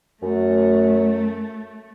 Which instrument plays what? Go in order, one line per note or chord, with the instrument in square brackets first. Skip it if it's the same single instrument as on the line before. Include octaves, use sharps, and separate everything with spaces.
[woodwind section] F#2 [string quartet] A3